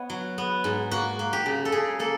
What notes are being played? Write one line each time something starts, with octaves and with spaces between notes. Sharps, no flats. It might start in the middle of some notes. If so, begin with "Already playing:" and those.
Already playing: B3 C#5 D#5
F#3
B3
G#2
A#3 F#4
A#3
G4
C#3
A4
C#3 G#4
A#3 A4